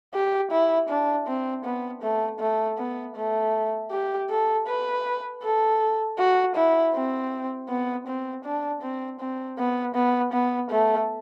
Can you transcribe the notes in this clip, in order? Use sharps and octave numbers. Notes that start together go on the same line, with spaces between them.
G4
E4
D4
C4
B3
A3
A3
B3
A3
G4
A4
B4
A4
F#4
E4
C4
B3
C4
D4
C4
C4
B3
B3
B3
A3